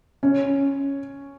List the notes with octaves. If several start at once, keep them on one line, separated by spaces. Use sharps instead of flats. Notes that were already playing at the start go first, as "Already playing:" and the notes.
C#4